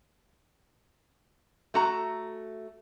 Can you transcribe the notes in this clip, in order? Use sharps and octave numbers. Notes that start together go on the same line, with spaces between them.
A3 F#4 A#5